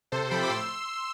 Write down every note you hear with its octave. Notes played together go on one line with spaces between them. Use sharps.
C3 A4 C5
F3 G5 B5
D6
A2 C6 E6